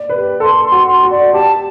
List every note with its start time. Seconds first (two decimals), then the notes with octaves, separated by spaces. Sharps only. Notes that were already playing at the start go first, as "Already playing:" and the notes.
Already playing: D5
0.10 B4
0.17 G4
0.40 A4 C6
0.65 C6
0.72 F#4
0.87 C6
1.03 F#4
1.10 D5
1.33 G4 A5